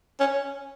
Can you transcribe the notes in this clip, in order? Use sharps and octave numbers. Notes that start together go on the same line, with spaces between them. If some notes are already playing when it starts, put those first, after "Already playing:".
C#4